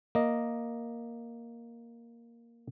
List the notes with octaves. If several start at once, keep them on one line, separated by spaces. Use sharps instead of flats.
A#3 D#5